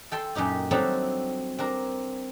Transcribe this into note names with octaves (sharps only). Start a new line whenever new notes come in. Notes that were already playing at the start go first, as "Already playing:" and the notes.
A4 G5 A5 C6
F#2 A#2 D#4 G4
F#3 G3 C4 D4 D#4 A4
C4 D4 A#4